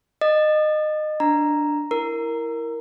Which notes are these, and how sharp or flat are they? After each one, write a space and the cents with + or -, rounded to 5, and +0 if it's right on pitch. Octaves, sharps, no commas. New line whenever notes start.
D#5 -20 D#6 -40
D4 +0 A#5 +0
E4 +0 A#4 +0